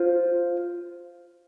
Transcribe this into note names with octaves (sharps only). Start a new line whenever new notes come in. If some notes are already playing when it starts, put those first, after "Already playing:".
Already playing: F4 C5